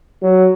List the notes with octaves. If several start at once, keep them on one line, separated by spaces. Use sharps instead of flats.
F#3